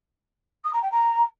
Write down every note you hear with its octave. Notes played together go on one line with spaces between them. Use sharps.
D#6
A#5
G5
A#5